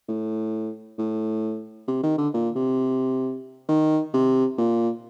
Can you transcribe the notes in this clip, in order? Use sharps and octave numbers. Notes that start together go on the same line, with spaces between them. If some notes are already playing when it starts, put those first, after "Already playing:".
A2
A2
C3
D#3
D3
A#2
C3
D#3
C3
A#2